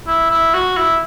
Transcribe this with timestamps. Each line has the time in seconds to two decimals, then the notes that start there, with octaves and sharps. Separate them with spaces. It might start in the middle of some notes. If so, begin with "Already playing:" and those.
0.07 E4
0.31 E4
0.54 F#4
0.77 E4